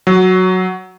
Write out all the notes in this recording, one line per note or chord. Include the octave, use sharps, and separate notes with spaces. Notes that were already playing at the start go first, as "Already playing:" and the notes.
F#3